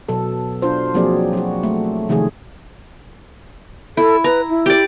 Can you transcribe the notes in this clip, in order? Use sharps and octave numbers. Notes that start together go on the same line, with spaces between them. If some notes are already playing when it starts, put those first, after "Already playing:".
B2 F#3 A4
D4 F4 C5
F3 F#3 A#3 C4 G#4 D5
F#3 F#4
A3
C3 D#3 F3 A3 G#4
E4 A4
B4 A#5
E4
G4 D5